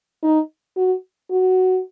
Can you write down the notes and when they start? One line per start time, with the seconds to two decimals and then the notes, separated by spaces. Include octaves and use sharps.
0.23 D#4
0.77 F#4
1.31 F#4